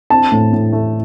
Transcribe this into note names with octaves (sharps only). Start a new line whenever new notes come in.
C4 A5
A2
A2
A3